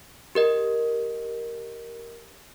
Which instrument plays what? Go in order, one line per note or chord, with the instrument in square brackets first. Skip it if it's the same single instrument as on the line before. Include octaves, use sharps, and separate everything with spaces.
[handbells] G4 A#4 D#5